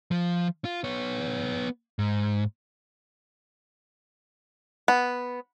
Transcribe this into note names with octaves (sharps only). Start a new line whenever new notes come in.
F3
F4
B3 C#5
G#2
B3